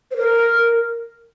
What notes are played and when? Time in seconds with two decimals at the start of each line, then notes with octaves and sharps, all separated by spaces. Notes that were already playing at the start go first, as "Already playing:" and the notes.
0.11 C5
0.17 A#4